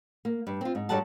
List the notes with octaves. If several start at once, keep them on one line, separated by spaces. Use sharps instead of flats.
A#3
G2
C4 F4
G#2
G2 F#3 G3 A4 F#5 A5